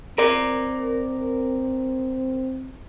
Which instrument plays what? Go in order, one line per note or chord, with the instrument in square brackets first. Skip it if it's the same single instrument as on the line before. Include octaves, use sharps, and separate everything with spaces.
[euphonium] C4 [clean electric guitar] A#4 D5